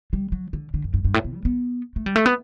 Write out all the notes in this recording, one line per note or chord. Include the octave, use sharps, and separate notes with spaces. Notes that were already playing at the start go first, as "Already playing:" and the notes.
G3
F#3
D3
D3
F#2
G2
G2
A2
B2
G3
B3
A3
G3
A3
B3